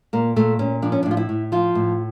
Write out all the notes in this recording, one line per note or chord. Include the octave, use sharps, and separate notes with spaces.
A#2 A#3
A#2 A3
A#2 C#4
F3 D4
C#4
A2 D4
F4
E4
A2
F3 F4
A2